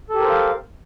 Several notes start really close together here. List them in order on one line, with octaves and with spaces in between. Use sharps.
A4 G4 A#4 C5 F5